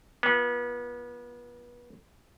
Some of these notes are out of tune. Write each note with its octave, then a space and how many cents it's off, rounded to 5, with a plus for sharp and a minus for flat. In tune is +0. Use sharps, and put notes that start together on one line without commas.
B3 -30 F4 -10